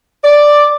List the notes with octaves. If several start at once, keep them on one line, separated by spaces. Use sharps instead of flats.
D5